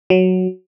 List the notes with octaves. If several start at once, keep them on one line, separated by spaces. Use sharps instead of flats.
F#3